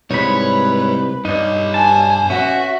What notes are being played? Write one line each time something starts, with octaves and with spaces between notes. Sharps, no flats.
C2 G#3 D#4 B4 C#5 B5
G2 D#4 B4 C#5
G#5 A5
C#4 F#4 E5